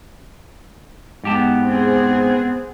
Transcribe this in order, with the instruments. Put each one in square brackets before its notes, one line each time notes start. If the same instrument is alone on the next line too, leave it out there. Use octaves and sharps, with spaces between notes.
[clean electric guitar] G#2 G4 A5 [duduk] B3
[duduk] B3 [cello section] C4 G#4